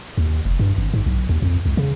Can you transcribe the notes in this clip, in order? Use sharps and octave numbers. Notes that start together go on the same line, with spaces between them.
D#2
F1
G2
G#1
G#2
B1
D#2
F2
C#2
C#3